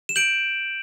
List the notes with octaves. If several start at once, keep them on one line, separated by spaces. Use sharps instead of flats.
E7
G6 D7 F#7